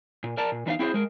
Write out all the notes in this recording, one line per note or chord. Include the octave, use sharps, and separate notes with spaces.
A#2
A#4 D5 A5 A#5
A#2
E2 D#3 D4 D#4 F5
C4 E4 F#4 G#4 A#4 C5
G#3 A#4